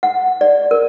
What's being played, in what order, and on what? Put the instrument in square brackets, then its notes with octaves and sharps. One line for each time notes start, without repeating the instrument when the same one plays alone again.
[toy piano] F#5
D5
A#4